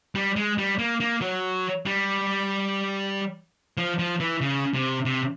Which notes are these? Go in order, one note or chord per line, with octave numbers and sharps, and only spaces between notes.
G3
G#3
G3
A#3
A#3
F#3
G3
F3
F3
E3
C#3
C3
C3